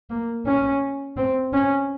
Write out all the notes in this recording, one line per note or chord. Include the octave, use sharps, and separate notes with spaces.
A#3
C#4
C4
C#4